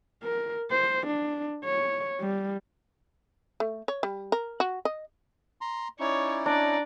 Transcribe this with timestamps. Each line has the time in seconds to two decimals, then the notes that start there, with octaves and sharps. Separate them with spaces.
0.23 A#4
0.71 C5
1.07 D4
1.65 C#5
2.20 G3
3.60 A3
3.88 C#5
4.03 G3
4.32 A#4
4.60 F#4
4.85 D#5
5.61 A#5 C6
6.00 C#4 D#4 E4 C#5 D5
6.46 D4 D5 A#5